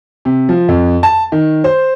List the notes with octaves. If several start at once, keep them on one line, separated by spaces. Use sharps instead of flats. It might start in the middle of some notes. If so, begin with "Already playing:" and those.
C3
F3
F2
A5
D#3
C5